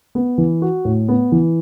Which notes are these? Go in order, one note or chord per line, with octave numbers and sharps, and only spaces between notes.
B3
E3
F#4
A2
B3
E3